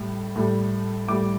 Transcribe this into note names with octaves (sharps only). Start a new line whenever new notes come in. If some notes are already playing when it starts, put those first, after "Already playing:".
Already playing: A2 G3
A2 G3
A2 G3 D6